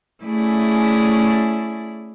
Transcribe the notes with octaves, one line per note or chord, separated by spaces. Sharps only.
A3 C#4 E4 G#4 D5